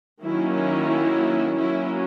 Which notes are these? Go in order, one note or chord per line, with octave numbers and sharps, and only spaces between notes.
D#3 F#3 A#3 C#4 E4
E4
F#3 A#3 C#4 E4